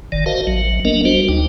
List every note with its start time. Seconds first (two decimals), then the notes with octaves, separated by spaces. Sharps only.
0.12 G1 D#3 D5
0.26 F#4 A#4 C5 D#5 F5 A5
0.47 A1 F#3
0.85 A#3 B3 D4 A#4 D#5
1.05 G3 D4 F#4 C5
1.29 D2 D#4 G5